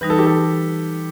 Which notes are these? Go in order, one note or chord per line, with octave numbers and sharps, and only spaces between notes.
E3 G3 D#4 B4
A4
G4
A4